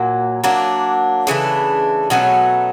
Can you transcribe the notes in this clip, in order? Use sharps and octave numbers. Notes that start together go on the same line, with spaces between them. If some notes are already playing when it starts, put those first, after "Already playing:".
Already playing: A#2 F#3 A#3
F#3 A#3 D4
C#3 E3 A3 D4
B2 F#3 A3 C#4